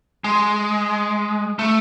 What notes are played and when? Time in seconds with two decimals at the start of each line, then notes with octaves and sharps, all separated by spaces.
0.24 G#3
1.59 A3